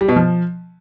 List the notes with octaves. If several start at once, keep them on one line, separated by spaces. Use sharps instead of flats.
G3
B2
F3